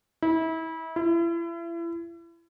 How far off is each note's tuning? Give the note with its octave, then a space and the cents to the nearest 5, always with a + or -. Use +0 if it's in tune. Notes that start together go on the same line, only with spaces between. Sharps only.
E4 -30
E4 +35